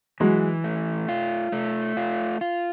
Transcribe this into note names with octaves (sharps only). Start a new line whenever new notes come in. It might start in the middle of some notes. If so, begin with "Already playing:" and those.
E3 F#3 G#3
A3
F4
A3
F4
F4